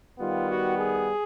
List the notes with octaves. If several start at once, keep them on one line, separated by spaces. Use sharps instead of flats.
D#3 G3 B3 F4
F#4
G#4